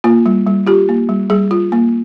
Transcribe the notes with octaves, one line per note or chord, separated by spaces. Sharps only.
A#3 F4
G3
G3
F4 G4
A#3
G3
G3 G#4
F4
A#3